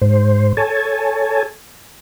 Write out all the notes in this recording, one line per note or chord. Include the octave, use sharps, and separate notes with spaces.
G#2 C5
A4 C#5 G#5 A5